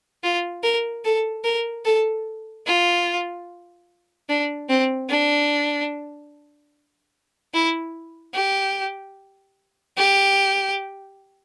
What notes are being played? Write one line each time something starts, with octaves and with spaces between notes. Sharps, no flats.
F4
A#4
A4
A#4
A4
F4
D4
C4
D4
E4
G4
G4